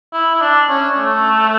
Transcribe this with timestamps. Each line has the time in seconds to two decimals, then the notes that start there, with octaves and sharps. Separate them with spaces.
0.13 E4
0.35 E4
0.41 D4
0.70 C#4
0.98 A3